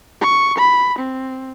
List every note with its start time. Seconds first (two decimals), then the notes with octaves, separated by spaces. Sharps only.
0.21 C#6
0.58 B5
0.99 C4